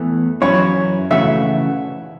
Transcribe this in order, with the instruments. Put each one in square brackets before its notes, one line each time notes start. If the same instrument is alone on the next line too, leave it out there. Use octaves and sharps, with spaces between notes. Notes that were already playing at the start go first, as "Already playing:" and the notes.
Already playing: [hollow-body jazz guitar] E2 E3 A3
[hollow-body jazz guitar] F#2 E3 C#4 E4 [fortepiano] C#5
[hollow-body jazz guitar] C#3 E3 A3 F#4 [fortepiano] E5